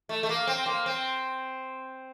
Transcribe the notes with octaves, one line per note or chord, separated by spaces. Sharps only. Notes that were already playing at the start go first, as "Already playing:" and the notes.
A3
A3
A#3
C4
A#3
C4